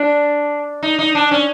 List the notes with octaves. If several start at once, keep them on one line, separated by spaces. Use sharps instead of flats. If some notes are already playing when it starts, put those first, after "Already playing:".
Already playing: D4
D#4
D#4
D4
C#4